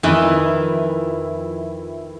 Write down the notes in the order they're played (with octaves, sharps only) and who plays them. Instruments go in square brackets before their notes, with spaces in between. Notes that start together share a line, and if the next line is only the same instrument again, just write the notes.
[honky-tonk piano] F2 E4 [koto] D#3 E3